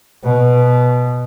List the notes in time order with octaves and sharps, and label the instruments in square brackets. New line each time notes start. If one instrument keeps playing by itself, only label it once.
[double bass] B2